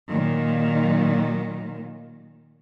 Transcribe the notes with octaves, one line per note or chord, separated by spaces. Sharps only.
A#2 D#3 F#3